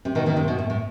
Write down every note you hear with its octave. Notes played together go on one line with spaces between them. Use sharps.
C3
B2 D#3
B2 D#3
C3
B2
A2
A2